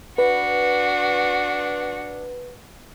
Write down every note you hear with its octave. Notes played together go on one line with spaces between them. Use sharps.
D4 F#4 B4